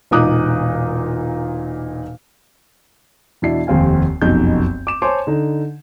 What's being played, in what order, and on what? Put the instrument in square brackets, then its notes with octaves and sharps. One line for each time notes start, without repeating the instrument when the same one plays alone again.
[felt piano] E1 A#2 D#4 D6 D#6 F#6
[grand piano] E2 B2 D4 E4 C7
F1 D#2 C4 F5 G#5
F1 B1 F#2 D#4 G6
D6 E7
C5 C#5 G#5 A5 C6 D6
D3 D#4